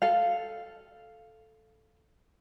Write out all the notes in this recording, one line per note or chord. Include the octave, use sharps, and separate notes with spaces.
A4 F5